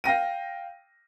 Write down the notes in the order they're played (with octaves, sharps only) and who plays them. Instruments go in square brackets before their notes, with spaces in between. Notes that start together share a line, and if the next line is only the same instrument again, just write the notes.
[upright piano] F5 G5 A#6 D#7